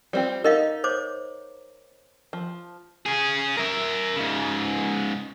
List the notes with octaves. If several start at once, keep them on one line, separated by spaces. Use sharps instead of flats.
G3 C4 F4
D#4 A#4 D#5 F5
C5 C#5 D6
F3
C#4 G#4
A#4 E5
G#2 C#3